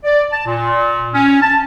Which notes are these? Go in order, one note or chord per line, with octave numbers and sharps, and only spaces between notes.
D5
A5
A#2
C#4
A5